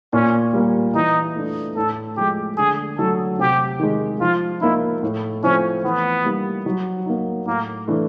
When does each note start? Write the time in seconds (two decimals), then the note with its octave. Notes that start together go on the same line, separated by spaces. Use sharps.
0.13 A#2 C#4
0.53 G3 A#3
0.95 E3 D#4
1.36 A3 D4
1.76 A2 A4
2.17 F3 G#3 G4
2.57 D3 G#4
2.98 F#3 A3 A4
3.39 C3 G4
3.79 D#3 G#3
4.21 F3 F4
4.61 A#3 D#4 E4
5.03 A2
5.43 F3 A3 C4 C#4 E4
5.84 E3 B3
6.25 G3 A#3 D#4
6.66 F#3
7.06 A#3 D#4
7.46 A2 A#3
7.88 E3 A3 D4